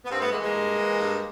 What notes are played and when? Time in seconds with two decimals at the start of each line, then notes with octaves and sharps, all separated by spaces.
0.05 B3
0.09 G2 A#3 C4
0.20 A3 B3
0.31 E3 G#3 A#3
0.38 A3
0.43 G#3 A#3
0.54 G2
0.77 E3
0.99 G2